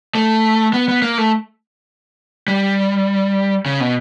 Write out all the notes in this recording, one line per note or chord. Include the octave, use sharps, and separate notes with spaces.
A3
B3
B3
A#3
A3
G3
C#3
B2